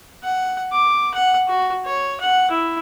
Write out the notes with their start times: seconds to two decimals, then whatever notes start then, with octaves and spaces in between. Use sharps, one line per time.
0.23 F#5
0.72 D6
1.14 F#5
1.48 F#4
1.85 C#5
2.20 F#5
2.50 E4